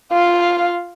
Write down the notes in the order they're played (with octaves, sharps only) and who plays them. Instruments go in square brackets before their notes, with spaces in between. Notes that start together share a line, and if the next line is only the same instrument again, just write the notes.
[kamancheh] F4 F5